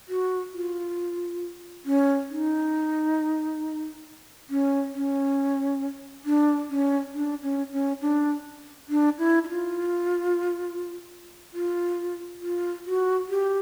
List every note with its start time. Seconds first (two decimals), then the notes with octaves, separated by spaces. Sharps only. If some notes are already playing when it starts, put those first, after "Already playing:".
0.09 F#4
0.54 F4
1.85 C#4
2.30 D#4
4.50 C#4
4.93 C#4
6.25 D4
6.69 C#4
7.14 D4
7.43 C#4
7.72 C#4
8.01 D4
8.89 D4
9.19 E4
9.44 E4
9.49 F4
11.53 F4
12.41 F4
12.86 F#4
13.30 G4